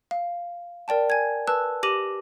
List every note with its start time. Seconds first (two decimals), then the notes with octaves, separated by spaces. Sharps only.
0.11 F5
0.88 A#4 D5 G5 A5
1.10 G#5 G#6
1.48 B4 A5 E6 F#6
1.83 G4 D6 A#6 D#7 F#7